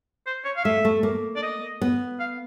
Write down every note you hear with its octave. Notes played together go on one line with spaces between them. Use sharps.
C5
C#5
F5
A3 E5
A3
A#3
D5
D#5
B3
F5